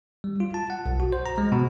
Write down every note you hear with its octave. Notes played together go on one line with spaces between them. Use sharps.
G3
F4
A5
F#5
B1
F#4
C5
A#5
G#3
B2